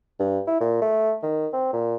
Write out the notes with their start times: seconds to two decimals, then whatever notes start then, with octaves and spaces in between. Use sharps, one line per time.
0.19 G2
0.47 E4
0.60 A#2
0.81 A3
1.23 D#3
1.53 C4
1.73 A#2